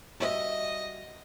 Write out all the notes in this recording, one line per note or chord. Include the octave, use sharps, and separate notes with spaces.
G3 F#4 D#5 E5